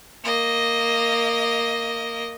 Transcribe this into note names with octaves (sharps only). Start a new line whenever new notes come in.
A#3 D#5